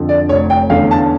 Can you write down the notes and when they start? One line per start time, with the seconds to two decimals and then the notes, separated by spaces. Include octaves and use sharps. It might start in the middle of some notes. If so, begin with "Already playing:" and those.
Already playing: F2 D3
0.09 D5
0.29 F1 C#5
0.50 G5
0.69 E2 D3 A3 C#4 F5
0.91 A5